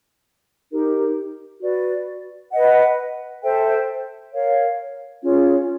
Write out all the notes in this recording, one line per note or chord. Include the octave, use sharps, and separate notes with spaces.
D#4 G4 A#4
F#4 B4 D5
B4 D#5 F#5
A4 C5 E5 G5
A#4 C#5 F5
C#4 F4 G#4 C#5